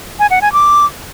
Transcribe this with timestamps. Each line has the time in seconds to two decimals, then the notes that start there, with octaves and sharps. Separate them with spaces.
0.19 G#5
0.31 F#5
0.42 G#5
0.53 D6